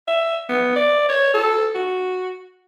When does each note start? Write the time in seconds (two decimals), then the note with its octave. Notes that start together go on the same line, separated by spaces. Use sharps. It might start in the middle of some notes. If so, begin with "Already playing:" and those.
0.08 E5
0.49 B3
0.76 D5
1.09 C#5
1.34 A4
1.75 F#4